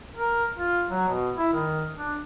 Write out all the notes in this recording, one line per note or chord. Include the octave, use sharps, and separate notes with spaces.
A#4
F4
F#3
B2
E4
D#3
D4